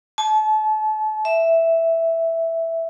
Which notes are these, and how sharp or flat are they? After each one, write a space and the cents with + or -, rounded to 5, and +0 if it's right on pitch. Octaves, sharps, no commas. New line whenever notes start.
A5 -35
E5 +0